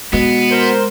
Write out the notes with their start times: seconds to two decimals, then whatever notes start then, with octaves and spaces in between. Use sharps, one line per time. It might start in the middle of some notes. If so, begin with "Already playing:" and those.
0.13 B2 G#3 B3
0.50 A#4 C5